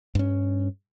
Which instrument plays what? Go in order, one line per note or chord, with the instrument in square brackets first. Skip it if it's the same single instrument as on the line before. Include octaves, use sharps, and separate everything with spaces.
[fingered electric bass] G2 C#4